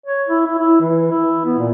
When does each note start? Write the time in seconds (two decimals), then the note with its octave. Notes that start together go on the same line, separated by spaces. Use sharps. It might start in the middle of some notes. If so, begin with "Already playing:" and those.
0.06 C#5
0.29 E4
0.46 E4
0.59 E4
0.81 E3
1.11 E4
1.46 B3
1.58 A#2